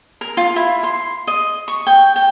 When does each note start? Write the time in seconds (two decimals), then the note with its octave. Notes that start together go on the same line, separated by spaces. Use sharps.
0.21 A#4
0.37 F4
0.56 E4
0.83 C6
1.27 D#5
1.68 C#6
1.87 G5
2.16 G5